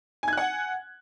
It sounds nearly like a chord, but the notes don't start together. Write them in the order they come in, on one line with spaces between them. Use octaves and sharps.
G#5 G#6 F#6 F#5